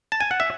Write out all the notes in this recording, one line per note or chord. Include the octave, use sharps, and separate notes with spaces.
A5
G#5
F#5
E5